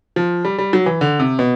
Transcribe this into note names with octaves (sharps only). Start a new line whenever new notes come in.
F3
G3
G3
F#3
E3
D3
C3
B2